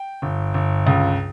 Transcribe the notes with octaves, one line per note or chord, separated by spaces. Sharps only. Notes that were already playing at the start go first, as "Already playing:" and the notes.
Already playing: G5
G1
G1
C#2